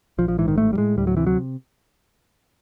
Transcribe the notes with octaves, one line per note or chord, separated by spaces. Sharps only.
A#1 F3
F3
G#2 E3
D#3
A1 A3
G3
A2 G#3
D2 G3
F#3
C3 E3
F#3